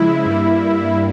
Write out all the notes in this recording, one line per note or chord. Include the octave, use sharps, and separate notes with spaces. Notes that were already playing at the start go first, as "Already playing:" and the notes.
Already playing: C#3 F3 G#3 E4
G2 G3 A#3